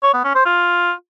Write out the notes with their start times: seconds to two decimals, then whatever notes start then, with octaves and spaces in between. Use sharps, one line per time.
0.03 C#5
0.14 B3
0.24 C#4
0.35 C5
0.46 F4